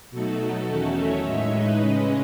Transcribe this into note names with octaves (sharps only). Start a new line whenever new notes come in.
B2 F#3 A3 D#4 F#4 A4
F#4 A4
E2 D#3 A3 C#4
C#5 E5
A2 G#3 D#4 C#5 E5
B4 D#5
C#3 G#3 C#4